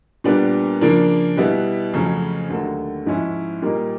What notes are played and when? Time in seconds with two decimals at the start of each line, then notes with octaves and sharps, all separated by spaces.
0.24 A#2 G3 B3 D4
0.81 C#3 F3 A#3 D4
1.37 B2 G3 B3 E4
1.93 F2 C#3 F#3 A3 C#4
2.49 D#2 D3 F#3 A3
3.06 G#2 F3 G#3 C#4 E4
3.62 A#2 G3 A#3 D#4